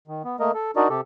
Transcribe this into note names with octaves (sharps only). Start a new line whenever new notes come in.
D#3
B3
A3 A#3 A#4 D#5
A4
D4 D#4 F#4 A#4 D5 D#5
C3 G4 A4